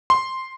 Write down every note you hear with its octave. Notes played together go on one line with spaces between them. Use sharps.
C6